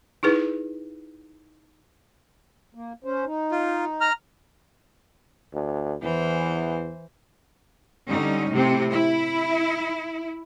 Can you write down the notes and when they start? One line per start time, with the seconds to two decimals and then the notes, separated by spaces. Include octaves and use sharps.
0.23 D#4 E4 G#4 B4
2.75 A#3
3.04 C#4 C5
3.26 D#4
3.52 F4
4.01 A#5 F6
5.53 D2
6.02 E2 E3 C5
8.08 D3 G3 C#4 D#4
8.51 A2 C3 C4
8.91 E4